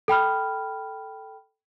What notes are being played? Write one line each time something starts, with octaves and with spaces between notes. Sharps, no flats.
A4 G5 B5 F6